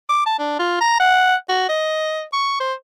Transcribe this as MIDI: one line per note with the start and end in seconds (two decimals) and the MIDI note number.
0.09 0.23 86
0.26 0.38 81
0.39 0.58 62
0.59 0.77 65
0.81 0.99 82
1.00 1.35 78
1.49 1.66 66
1.69 2.22 75
2.33 2.55 85
2.60 2.74 72